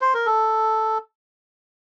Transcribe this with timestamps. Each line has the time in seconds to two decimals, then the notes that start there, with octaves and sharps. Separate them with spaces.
0.01 C5
0.14 A#4
0.26 A4